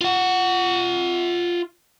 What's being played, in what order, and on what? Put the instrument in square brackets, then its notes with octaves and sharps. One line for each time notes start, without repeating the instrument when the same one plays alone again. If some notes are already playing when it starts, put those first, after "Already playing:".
[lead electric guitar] F4 F#5